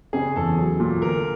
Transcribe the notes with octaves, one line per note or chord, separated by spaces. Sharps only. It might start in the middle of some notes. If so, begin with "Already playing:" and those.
C#3 G#4
E2 A4
F#3
A#2
D3 A#4